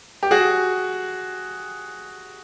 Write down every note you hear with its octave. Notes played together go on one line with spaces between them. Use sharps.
G4
F#4 G#4